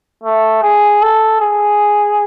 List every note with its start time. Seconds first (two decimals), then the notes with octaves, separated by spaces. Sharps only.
0.24 A3
0.63 G#4
1.02 A4
1.41 G#4